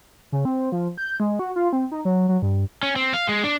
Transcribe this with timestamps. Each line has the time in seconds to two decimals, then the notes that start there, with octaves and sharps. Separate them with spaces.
0.32 C#3
0.45 C4
0.72 F3
0.98 G6
1.20 G#3
1.39 F#4
1.56 F4
1.73 C4
1.92 D#4
2.05 F#3
2.29 F#3
2.42 G2
2.83 C#4
2.96 C4
3.14 F5
3.29 G#3
3.44 D4